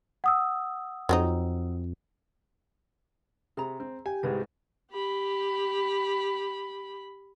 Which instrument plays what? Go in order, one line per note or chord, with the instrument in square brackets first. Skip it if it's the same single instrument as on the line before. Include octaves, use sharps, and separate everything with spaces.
[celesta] F#5 D#6 E6
[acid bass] F2 [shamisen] F#3 C4 D#4
[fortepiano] C3 [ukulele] G#4 A#5
[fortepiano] C4
[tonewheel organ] G4 [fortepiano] G#5
[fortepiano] C2 G#2 G#3 [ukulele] B4
[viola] G4 B5